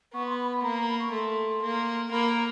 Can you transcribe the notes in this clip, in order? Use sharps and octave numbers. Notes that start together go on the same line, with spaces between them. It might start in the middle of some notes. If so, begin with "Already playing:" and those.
B3 C#6
C6
B5
B5
A#3 A#5
A#5
B5
C#6
A3 C6
A#3
A#3 B5
A#5